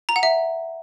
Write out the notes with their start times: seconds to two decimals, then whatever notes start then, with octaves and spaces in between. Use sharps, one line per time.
0.09 A#5
0.16 F#5
0.23 E5